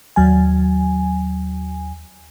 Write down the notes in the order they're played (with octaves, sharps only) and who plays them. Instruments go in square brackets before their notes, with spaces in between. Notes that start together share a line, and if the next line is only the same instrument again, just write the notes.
[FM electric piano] D#2 F#3 G#5